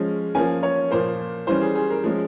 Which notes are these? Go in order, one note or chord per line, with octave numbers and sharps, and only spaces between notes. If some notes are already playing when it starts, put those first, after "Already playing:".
Already playing: F3 G#3 C#4
F3 A#3 C#4 G#5
C#5
A#2 F3 A#3 C5
E3 G3 C#4 C5
G#4
G#4
A#4
F3 G#3 C#4